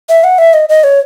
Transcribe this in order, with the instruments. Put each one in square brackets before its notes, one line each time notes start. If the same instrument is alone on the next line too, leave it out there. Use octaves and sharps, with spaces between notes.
[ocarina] E5
F#5
E5
D#5
D#5
C#5